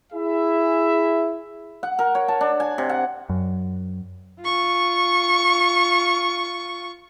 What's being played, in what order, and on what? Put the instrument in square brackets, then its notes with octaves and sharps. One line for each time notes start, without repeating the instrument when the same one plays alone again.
[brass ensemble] E4 G#4 E5
[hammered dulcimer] F#5
A#4
C#5
A5
D4
G#5
C3
F#5
[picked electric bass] F#2
[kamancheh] F4 C#6